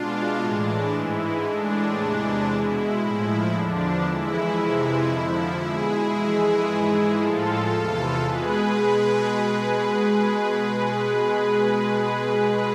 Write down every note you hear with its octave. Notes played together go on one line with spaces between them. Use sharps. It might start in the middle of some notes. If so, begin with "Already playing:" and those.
Already playing: B2 G#3 D4 F4
A2 E3 G#3 D4
G#2 E3 G#3 E4
A2 E3 G#3 D4
E2 C3 E3 G#3
B2 G#3 E4
A2 F3 G#3
E2 D3 F3 D4
F2 E3 G#3 E4
F2 C3 E3 G#3 E4
F2 D3 F3 E4
B2 G#3 E4 G#4
F2 E3 G#3
G#2 E3 G#3
A2 F3 G#3 F4 A4
E2 C3 E3
B2 G#3 G#4 B4